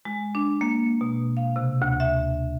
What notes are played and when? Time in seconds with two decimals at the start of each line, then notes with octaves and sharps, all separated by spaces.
0.05 G#3
0.35 D4
0.61 A#3
1.01 B2
1.37 F5
1.56 C3
1.82 D2
2.00 E5